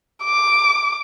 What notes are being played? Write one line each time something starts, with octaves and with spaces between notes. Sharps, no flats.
D6